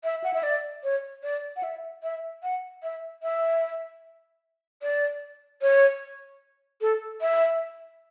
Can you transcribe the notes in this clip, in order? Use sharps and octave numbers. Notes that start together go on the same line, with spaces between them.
E5
F#5
E5
D5
C#5
D5
F#5
E5
E5
F#5
E5
E5
D5
C#5
A4
E5